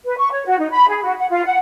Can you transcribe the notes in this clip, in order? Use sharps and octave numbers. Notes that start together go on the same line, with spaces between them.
B4
C#6
C#5
F#4
D#4
B5
G#4
F#4
F#5
F4
F#5